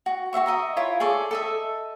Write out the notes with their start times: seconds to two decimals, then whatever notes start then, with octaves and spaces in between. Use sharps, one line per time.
0.06 F#4
0.33 F#4 C5 E5 C#6
0.46 D#5 E5 A#5
0.77 E4 F4 C#5
1.00 G#4 A4 D5 C#6
1.31 A4 D#5 E5